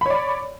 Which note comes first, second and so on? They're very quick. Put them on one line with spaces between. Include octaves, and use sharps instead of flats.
B5 C#5 D5